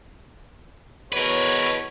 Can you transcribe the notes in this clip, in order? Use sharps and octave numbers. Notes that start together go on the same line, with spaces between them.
E2 B2 A#4 B4 C#5